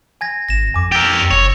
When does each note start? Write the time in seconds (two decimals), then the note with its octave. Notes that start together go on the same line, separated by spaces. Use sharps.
0.21 G#5 G#6 A#6
0.49 G#1 A#6 E7
0.74 F2 G#5 D6
0.92 G4 A#4 E6 A6
1.31 F#1 C#5